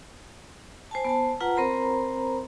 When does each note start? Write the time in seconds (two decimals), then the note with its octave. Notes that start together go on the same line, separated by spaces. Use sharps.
0.91 C5 G#5 A5
1.05 B3 C5 A5
1.41 F4 B4 F#5 A#5
1.57 C4 A#4 C5 A#5 B5